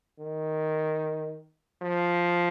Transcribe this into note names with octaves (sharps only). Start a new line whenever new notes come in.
D#3
F3